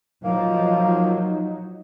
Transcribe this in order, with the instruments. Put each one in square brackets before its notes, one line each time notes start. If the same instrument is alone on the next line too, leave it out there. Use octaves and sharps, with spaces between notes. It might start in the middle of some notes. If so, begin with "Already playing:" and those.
[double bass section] F3 [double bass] F#3 [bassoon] A#3 [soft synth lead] D#4